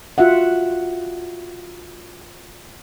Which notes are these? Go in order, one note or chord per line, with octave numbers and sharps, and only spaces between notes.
F4 F#4 E5 F#5